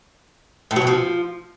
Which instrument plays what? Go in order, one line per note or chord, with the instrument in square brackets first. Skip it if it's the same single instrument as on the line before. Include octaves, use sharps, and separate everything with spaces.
[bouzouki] A2
F#3
B2
F3